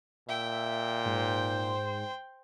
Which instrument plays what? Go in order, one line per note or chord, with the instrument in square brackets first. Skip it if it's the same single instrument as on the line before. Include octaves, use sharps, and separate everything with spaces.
[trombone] A#2 [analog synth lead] E5 [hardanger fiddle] G5
[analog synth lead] G#2 [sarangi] C5